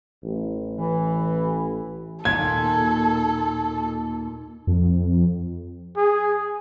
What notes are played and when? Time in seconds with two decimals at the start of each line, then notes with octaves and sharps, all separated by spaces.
0.24 A1
0.77 E3
2.25 D#2 A#2 A#3 A4 G#5 G#6
4.67 F2
5.97 G#4